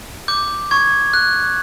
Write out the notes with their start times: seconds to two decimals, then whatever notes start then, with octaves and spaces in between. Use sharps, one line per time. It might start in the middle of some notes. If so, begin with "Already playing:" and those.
0.28 D6 G6
0.71 C#6 G#6
1.13 F#6